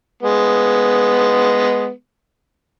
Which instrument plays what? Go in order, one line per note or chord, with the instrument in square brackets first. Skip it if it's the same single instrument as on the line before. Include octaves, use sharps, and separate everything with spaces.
[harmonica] G#3 B3